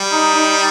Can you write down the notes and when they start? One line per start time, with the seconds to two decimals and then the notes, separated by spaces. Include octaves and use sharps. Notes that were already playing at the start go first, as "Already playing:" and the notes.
Already playing: G3
0.12 D#4
0.34 D#4